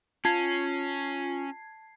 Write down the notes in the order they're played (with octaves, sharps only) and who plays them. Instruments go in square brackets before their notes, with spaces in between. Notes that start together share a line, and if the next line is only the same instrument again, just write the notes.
[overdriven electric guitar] C#4 [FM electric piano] F4 [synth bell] A5 G#6 C7